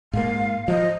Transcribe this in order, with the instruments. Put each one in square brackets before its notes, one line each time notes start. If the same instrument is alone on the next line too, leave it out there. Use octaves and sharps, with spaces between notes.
[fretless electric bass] G#2 A#3 [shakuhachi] F5
[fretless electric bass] F3 [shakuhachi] D#5